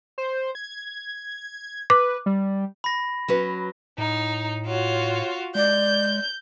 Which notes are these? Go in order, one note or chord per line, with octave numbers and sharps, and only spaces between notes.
C5
G#6
B4 D6
G3
B5 A#6
F#3 C#4 B4
A2 D#4
F4 F#4 C#5
G#3 D5 G6